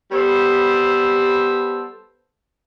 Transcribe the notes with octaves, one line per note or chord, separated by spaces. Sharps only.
G3 B3 A4 C5